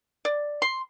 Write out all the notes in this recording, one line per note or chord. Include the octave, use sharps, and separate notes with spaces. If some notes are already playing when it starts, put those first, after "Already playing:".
D5
C6